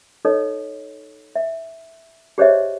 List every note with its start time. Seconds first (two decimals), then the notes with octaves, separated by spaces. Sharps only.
0.25 D#4 A4 C#5 D#5
1.36 E5
2.38 G4 G#4 C5 C#5 D#5 E5